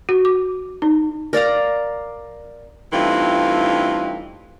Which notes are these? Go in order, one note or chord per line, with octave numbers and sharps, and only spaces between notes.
F#4
D6
D#4
A#4 D5 F5 A#5
G2 E3 A3 C4 D#4 F4